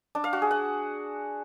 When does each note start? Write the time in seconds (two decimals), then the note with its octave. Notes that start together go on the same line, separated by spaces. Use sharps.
0.15 D4
0.24 F5
0.33 F#4
0.42 G#4
0.51 F#5